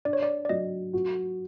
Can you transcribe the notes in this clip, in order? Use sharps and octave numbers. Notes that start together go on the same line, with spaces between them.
D4 D5
C#5
D5
D5
F#3 D#5
F#4